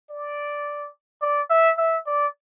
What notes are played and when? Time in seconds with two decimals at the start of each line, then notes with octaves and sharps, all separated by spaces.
0.10 D5
1.22 D5
1.50 E5
1.78 E5
2.06 D5